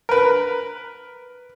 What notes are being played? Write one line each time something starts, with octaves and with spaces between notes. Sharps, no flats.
A#4 B4